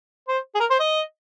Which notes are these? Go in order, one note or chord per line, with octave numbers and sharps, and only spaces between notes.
C5
G#4
A#4
C5
D#5